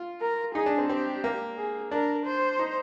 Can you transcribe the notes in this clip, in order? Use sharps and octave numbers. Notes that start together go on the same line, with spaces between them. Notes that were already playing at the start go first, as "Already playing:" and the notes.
Already playing: F4
A#4
D#4 G#4
D4
C4
C4 G4
A#3
G#4
D4 A#4
C5
D#4